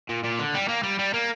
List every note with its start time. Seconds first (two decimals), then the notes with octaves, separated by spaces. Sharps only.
0.09 A#2
0.24 A#2
0.39 D3
0.54 G3
0.68 A#3
0.83 G3
0.99 G3
1.14 A#3